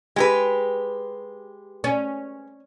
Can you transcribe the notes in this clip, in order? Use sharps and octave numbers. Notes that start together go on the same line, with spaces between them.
G#3 G4 B4
C#4